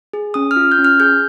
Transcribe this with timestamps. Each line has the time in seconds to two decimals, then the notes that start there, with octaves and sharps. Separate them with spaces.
0.13 G#4
0.34 C#4 D#6
0.51 F6
0.56 F4
0.72 G6
0.79 C#4
0.84 F6
1.00 G#4 G6